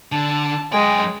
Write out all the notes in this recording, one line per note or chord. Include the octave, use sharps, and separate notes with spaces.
D3 A5
F#2 G#3 G5 G#5